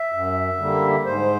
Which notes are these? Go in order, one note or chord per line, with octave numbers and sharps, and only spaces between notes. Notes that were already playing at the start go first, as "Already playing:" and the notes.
Already playing: E5
F#2
D3 G3 A#3
G#2 C5